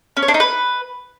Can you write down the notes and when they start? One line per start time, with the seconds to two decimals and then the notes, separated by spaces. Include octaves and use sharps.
0.17 C#4
0.22 C#5
0.28 D4
0.34 D#4
0.40 B4